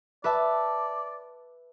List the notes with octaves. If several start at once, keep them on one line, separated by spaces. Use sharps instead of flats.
B4 D5 E5 A5